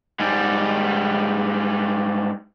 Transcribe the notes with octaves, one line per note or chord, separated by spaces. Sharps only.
G#2 G3